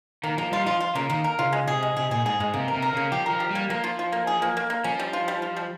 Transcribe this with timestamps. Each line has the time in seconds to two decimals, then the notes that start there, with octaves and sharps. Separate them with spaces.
0.23 D#3 A#3
0.38 F3 A#3
0.52 G3 F4
0.66 F3 F4
0.80 F4
0.95 C#3 A#3
1.10 D#3 A#3
1.24 A#4
1.39 C#3 F4
1.53 G#3
1.67 C3 G#4
1.83 G#3
1.97 C3 G#4
2.11 A#2 G#4
2.25 G#2 G#4
2.40 G#2 G#3
2.54 C3 A#3
2.68 A#4
2.73 C3
2.82 A#4
2.93 C#3 A#3
3.12 F3 G4
3.26 A#4
3.31 F3
3.40 G4
3.51 G3 A#3
3.70 F3 A#3
3.84 F4
3.99 F4
4.12 A#3
4.27 G#4
4.42 A#3
4.57 A#3
4.70 A#3
4.84 F3 C#4
4.99 G3
5.13 F4
5.28 G3
5.42 F4
5.56 G3